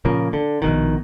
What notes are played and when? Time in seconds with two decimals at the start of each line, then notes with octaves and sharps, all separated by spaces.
0.05 A#2 C#3 F3 A#3
0.33 D3
0.62 A#1 B2 D#3